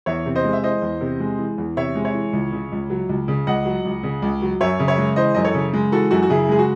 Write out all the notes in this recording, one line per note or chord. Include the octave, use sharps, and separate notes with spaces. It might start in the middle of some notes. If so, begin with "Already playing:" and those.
E2 C#5 E5
C3
C5 D#5
G#3
E5
E3 C5 D#5
E2
C3
G#3
E3
E2
C3 C#5 E5
G#3
C#5 E5
E3
C#2
C#3
C#2
F#3
C#2
C#3
C#2 D#5 F#5
F#3
C#2
C#3
C#2
F#3
F#2 C#5 E5
C#3
C#5 E5
G#3
E3 C5 D#5
F#2 D#5
A4 C#5
C#3
G#3
E3 F#4 A4
F#2 F#4 A4
F#4
C#3 E4 G#4
G#3 G#4
F#4